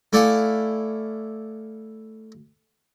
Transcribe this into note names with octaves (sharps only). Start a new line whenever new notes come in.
A3 E4 D5 F5 F#5 G#5